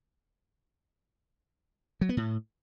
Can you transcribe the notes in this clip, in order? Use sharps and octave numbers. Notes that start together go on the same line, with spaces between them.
F#3
B3
A2